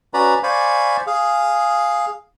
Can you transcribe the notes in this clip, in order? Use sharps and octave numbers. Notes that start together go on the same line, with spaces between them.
C#4 F#4 B4 D5 A#5 B5
C5 D5 F5 G#5 B5 C#6
G#4 F5